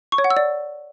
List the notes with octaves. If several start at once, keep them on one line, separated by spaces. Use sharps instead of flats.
C#6
C#5
F#5
E6
D5